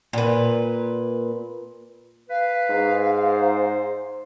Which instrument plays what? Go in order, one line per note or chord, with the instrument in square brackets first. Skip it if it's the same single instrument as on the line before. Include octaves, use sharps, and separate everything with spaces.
[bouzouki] A#2 B4
[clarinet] B4 [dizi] F5
[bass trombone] G#2
[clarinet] C5